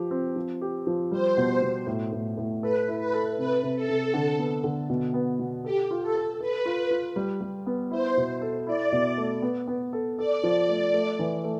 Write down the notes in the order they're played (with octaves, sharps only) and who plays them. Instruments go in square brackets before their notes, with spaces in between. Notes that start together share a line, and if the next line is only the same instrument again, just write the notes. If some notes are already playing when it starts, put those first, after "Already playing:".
Already playing: [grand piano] F3 G4
C4
F3
G4
F3
[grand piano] G3 [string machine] C5
[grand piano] B2
B2
A2
A2
A2
[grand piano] A4 [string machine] B4
[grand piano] E4
[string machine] B4
[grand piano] A4
[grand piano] C3 [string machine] B4
[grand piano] C3
[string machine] A4
[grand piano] C3
D3
B3
D3
B2
B3
B2
[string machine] G4 [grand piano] A4
[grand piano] F4
[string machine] A4
[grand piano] A4
[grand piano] A4 [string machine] B4
[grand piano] F4
F4
G3
G3
B3
[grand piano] E4 [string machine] C5
[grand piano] B2
A4
[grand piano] E4 [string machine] D5
[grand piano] B2
A3
B3
B3
A4
[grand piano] A4 [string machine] D5
[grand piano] F3
A3
A3
E3
A3